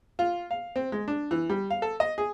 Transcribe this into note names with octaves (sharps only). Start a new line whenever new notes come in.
F4
F5
C4
G#3
D4
E3
G3
F5
A4
D#5
G#4